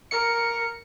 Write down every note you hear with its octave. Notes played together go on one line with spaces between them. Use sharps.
A#4 C#7